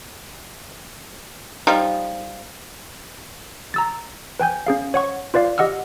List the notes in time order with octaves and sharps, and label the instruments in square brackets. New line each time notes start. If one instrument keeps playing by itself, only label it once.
[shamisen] F3 G3 D#4
[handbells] A#5 E6 A6
B4 G5 G#5 G6
C#4 G#4 F5
C#5 F#5 C#6
F4 B4 D5 F5
G4 D#5 F#5 E6 F6